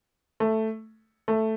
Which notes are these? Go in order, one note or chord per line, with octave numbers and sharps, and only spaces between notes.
A3
A3